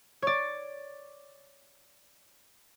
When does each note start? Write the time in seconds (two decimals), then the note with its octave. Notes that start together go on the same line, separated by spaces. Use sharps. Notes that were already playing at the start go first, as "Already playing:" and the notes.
0.22 C#5 D5